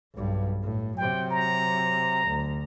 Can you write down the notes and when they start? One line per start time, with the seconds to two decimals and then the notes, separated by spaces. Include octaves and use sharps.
0.14 B1 G2
0.63 A2
0.98 C3 F#3 G5
1.30 A#5
2.28 D2